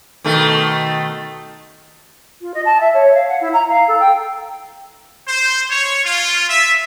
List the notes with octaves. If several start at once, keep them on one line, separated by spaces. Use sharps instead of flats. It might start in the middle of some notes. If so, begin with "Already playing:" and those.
B2 D#3 A3
F4
D#5
A5
E5
C#5
F5
F#5
E4
A#5
F5
A4
G5
C5
C#5
F4
E5